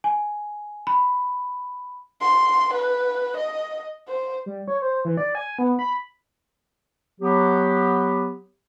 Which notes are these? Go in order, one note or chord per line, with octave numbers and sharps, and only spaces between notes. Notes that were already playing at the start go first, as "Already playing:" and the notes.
G#5
B5
C6
B4
D#5
C5
G3
C#5
C5
E3
D5
G#5
B3
B5
F#3 B3 G4